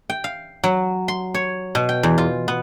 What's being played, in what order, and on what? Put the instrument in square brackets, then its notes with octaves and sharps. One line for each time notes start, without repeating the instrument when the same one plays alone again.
[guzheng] G5
F5
F#3
C6
C#5
B2
G5
E2
F4
B3